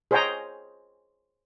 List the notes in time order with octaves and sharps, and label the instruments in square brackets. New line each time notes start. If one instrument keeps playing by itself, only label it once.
[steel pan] G#4 C5 C#5 D#5 G5 A#5